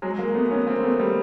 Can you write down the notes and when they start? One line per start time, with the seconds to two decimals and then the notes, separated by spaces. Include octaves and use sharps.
0.02 F#3 G#3
0.19 G#3 A#3
0.34 A3 B3
0.51 B3 C#4
0.67 A#3 C4
0.83 A3 B3
0.99 G3 A3